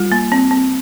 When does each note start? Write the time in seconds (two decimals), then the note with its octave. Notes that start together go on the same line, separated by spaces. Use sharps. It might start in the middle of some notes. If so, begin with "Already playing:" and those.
Already playing: G3 F4
0.12 A#3
0.32 C4
0.51 C4